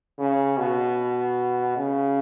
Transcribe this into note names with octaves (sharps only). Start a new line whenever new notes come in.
C#3
B2
C#3